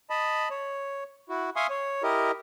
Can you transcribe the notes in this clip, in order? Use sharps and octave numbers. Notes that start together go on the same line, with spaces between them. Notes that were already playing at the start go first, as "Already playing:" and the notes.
D#5 A5 B5
C#5
E4 F#4
E5 F5 G#5 C6 C#6 D#6
C#5
E4 G4 A#4 D#5